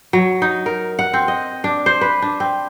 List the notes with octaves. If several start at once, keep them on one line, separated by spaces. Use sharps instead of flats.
F#3
D#4
A#4
F#5
C4
D#5
D4
C5
B4
D4
C4